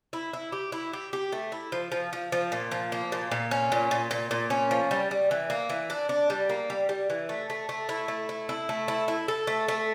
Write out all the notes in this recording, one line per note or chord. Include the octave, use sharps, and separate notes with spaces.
E4
E4
G4
E4
G4
G4
A3
E4
F3
F3
F3
F3
A#2
F3
A#3
A#2
A#2
C#4
A#2
A#2
A#2
A#2
C#4
F3
G3
G3
E3
A#3
E3
D4
D4
G3
A#3
G3
G3
E3
A3
A3
A3
E4
A3
E4
E4
A3
E4
E4
A4
A3
A3